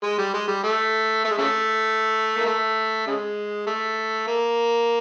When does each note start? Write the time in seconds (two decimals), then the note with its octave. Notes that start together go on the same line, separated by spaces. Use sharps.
0.03 G#3
0.18 G3
0.34 G#3
0.48 G3
0.63 A3
1.24 A3
1.31 G#3
1.38 C#3 A3
2.36 A#3
2.46 A3
3.07 C#3 G#3
3.67 A3
4.28 A#3